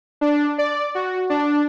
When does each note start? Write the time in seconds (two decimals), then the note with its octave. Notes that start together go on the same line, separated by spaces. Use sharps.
0.21 D4
0.58 D5
0.95 F#4
1.30 D4